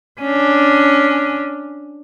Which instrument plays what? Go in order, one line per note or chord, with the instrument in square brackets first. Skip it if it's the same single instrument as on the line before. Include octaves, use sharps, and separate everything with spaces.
[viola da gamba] C#4 D4